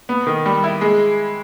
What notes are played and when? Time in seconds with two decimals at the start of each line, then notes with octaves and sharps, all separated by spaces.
0.09 B3
0.27 D#3
0.46 G3
0.64 E4
0.81 G#3